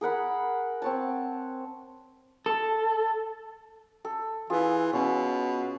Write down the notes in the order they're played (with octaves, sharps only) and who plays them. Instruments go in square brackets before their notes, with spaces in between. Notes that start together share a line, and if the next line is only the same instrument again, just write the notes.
[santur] G#4 A#4 F#5 B5
C4 C#5 A5
[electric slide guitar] A4
[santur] A4
[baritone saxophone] E3 [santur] F4 G#4
[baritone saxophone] B2 [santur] C#4